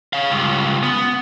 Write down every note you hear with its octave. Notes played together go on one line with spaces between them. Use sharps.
C#5 F5
C#2 G2
B3